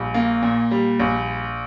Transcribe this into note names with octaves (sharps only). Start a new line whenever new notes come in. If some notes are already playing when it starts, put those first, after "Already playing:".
Already playing: A#1 G3
A#3
A#2
G3
A#1